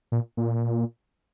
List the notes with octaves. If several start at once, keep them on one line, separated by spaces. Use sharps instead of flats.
A#2
A#2